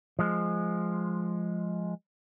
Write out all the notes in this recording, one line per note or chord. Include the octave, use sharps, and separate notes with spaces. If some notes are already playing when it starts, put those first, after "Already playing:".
F3 G#3